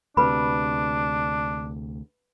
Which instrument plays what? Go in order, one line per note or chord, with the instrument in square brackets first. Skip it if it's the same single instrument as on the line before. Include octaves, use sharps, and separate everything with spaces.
[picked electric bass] D2 C3 [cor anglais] D4 [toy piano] B4 B5